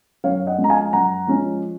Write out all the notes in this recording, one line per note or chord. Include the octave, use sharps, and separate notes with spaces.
F#2 C#5 F5
D#5 F#5
F3 G#3 C#4
A#5
F5 G#5
F#2 F#5 A#5
F3 G#3 C#4